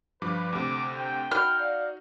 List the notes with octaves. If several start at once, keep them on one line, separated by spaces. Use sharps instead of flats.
G2 F3 B4 D6
D2 C3 D6
G5
D#4 F#4 B5 F6
D5 F5